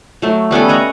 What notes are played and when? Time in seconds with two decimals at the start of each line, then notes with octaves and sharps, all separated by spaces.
0.22 F#3 A3
0.51 G3 B3 C#4 A4
0.69 C#5 D#5 F#5 A#5